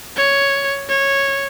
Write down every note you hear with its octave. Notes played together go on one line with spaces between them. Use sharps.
C#5
C#5